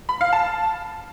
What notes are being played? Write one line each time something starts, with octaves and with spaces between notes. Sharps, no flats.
B5
F5
A5